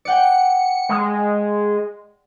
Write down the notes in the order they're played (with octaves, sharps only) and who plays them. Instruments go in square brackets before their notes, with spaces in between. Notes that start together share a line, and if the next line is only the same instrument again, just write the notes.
[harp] D5 F#5 G5 [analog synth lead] C#7
[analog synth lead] G#3